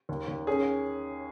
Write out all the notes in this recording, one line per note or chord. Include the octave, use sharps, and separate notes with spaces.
D#2
D#2
C#4 G#4